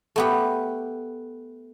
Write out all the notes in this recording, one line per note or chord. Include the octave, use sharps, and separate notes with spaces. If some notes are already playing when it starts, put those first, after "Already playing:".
A3 B3 G4